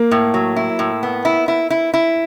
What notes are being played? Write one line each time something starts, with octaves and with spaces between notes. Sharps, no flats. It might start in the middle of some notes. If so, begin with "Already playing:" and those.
Already playing: A#3
A2
F#3
E4
A2
B3
E4
E4
E4
E4